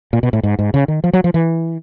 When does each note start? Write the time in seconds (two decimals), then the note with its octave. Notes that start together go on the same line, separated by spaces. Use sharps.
0.13 A#2
0.23 B2
0.33 A2
0.43 G#2
0.59 G#2
0.74 C#3
0.88 D#3
1.04 F3
1.13 F#3
1.24 F3
1.34 E3